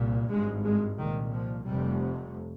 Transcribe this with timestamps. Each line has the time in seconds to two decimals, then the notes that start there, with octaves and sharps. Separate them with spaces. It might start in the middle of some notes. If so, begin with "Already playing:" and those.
Already playing: C2 A#2
0.30 G#1 G2 G#3
0.64 G#3
0.99 C2 A#2 D#3
1.33 F3
1.67 F1 F2 C3 G3